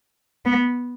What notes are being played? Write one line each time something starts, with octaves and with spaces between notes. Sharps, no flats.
B3